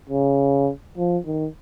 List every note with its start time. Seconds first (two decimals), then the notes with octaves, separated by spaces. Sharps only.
0.10 C#3
0.97 F3
1.26 D#3